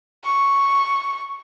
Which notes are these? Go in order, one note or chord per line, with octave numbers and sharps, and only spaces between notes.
C#6